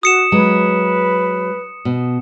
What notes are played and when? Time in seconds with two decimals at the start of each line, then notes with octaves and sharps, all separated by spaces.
0.03 F#4 D#6 C#7 E7
0.32 F#3 G#3 B4
1.85 B2